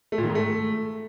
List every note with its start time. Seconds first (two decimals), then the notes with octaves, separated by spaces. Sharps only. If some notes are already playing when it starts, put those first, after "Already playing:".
0.12 A3
0.18 A#2
0.24 D#3
0.29 G#2
0.35 A3